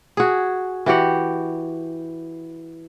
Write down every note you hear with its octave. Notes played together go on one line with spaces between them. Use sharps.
F#4 G#4
E3 F#4 G4 F#5